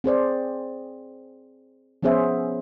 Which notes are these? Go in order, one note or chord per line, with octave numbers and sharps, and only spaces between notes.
C4 G#4 C5 D5
F3 B3 C#4 G#4 C5 E5